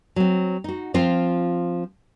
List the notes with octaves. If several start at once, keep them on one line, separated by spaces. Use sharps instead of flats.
F#3 C4
D#4 F#4
F3 C4 F4